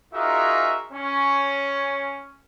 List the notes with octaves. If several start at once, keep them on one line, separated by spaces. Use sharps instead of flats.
D#4 F4 F#4 G#4 A#4 E5
C#4